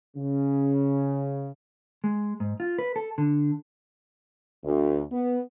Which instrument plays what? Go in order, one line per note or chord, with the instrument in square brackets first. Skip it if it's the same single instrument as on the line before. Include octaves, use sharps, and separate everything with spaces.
[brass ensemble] C#3
[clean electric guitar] G#3
G#2
F4
B4
A4
D3
[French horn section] D2
B3